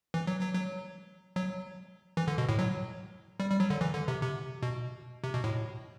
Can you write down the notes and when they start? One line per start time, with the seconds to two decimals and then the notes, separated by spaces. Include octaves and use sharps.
0.14 E3
0.27 F#3
0.41 F#3
0.55 F#3
1.36 F#3
2.17 E3
2.27 D3
2.38 B2
2.49 A2
2.59 F#3
3.40 G3
3.50 G3
3.60 F#3
3.70 D3
3.81 E3
3.94 D3
4.08 C3
4.22 C3
4.62 B2
5.24 C3
5.33 B2
5.44 A2